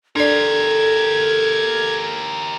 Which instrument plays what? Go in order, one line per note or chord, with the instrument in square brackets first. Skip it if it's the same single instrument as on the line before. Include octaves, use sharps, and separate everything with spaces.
[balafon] D4 D5 [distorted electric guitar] G4 A#4 [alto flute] A4 [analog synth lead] G#6